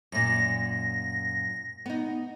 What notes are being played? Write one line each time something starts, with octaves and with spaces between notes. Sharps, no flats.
F#2 A#2 A#6
B3 D#4